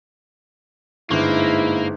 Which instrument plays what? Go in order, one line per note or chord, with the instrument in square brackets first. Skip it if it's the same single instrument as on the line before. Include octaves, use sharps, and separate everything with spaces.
[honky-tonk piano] G1 [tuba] G#2 [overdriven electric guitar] A#3 [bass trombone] E4